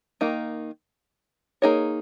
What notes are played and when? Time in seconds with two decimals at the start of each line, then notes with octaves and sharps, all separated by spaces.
0.21 D#3 A#3 D#4
1.62 A#3 D#4 G#4 C#5